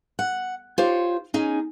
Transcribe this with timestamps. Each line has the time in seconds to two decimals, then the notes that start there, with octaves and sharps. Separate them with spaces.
0.19 F#5
0.78 F4 G4 C5 C#5
1.34 C#4 D#4 G#4